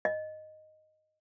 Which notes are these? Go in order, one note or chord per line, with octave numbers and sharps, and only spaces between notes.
D#5